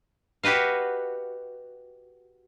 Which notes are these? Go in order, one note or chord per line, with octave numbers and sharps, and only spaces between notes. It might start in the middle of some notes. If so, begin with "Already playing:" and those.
F#4 G4 B4 D#5 F5